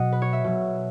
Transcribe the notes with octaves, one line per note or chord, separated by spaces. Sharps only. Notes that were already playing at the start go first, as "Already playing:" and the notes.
Already playing: B2 F#3 D#5 F#5
B4
C#5
E5
B2 F#3